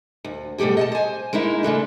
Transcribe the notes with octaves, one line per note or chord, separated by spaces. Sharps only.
D2
B2 G3 A3 G4 G#4
D#5 F#5 A5
C5 G#5
G#3 A#3 D#4 E4
C#3 G#3 A3 D4